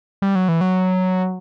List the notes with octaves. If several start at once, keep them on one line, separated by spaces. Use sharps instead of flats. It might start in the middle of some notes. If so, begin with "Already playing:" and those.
G3
F#3
E3
F#3